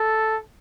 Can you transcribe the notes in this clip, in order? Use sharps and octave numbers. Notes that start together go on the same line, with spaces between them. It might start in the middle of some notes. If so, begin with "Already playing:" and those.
Already playing: A4